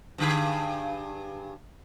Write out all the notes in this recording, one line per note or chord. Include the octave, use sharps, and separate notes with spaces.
G2 D3 G#4